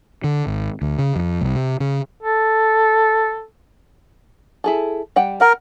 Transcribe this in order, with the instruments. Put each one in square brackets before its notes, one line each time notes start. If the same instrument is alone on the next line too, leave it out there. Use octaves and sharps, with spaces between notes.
[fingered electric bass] D3
G#1
D2
C#3
F2
C2
C3
C#3
[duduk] A4
[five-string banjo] E4 G#4 A4
G3 F#5 G5
[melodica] A#4 [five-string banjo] F#5